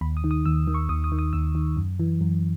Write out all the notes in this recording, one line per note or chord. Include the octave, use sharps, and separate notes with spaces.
D#2 B5
D#6
D#3
D#6
D#2 E6
D#3
C#6
D#2 D#6
D#6
D#3
D#6
D#2 E6
D#3
F#2
E3
F#2